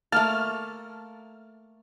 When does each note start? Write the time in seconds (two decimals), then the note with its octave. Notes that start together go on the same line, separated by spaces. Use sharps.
0.12 A3 A#3 A5 F6